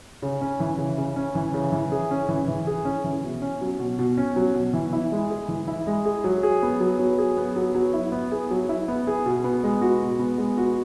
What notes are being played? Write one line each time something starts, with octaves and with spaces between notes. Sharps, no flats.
C#3
C#4
E3
C#3
C#3
C#4
E3
C#3
E3
G#4
C#4
E3
E3
G#4
C#4
E3
B2
C#4
F#3
B2
B2
C#4
F#3
B2
E3
E4
G#3
G#4
E3
E4
G#3
G#4
F#3
G#4
B3
F#3
F#3
G#4
B3
F#3
F#3
E4
B3
G#4
F#3
E4
B3
G#4
B2
B3
G#3
F#4
B2
B3
G#3
F#4